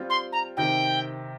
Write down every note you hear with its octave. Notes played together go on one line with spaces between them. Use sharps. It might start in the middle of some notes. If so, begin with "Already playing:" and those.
Already playing: G3 C4 F4
C6
A#5
C3 D#3 C4 G5